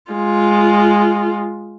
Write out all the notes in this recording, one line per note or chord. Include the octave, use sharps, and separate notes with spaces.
G#3 F4